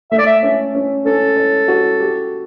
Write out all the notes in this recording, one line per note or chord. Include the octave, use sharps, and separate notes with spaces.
A3 E5
D5
E5
C#4
C#4
C#4 A4
C#5
F#4
G4